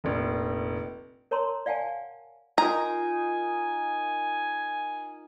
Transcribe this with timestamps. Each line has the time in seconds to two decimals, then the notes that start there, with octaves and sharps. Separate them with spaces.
0.04 F1 A#1
1.31 A#4 C#5 A5 A#5 C6
1.66 D5 F5 F#5 G#5 A5
2.58 D#4 F4 A#4 G#5 A#5